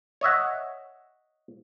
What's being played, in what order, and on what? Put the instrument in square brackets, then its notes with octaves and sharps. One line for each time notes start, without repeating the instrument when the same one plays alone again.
[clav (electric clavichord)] C#5 D#5 E5 F#5